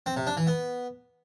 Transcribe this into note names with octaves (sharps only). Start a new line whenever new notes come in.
C4
C3
D4
E3
B3